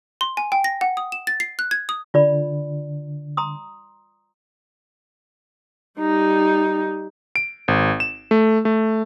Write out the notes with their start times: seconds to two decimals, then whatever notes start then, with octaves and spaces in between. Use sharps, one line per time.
0.21 C6
0.37 G#5
0.52 G5
0.64 A#6
0.81 F#5
0.97 D#6
1.12 E7
1.27 A6
1.40 C7
1.59 F#6
1.71 G#6
1.89 D#6
2.14 D3 F4 D5 B5
3.37 A#5 C6 D#6
5.99 G3 D#4
7.36 D7
7.68 G#1
8.00 E7
8.31 A3
8.65 A3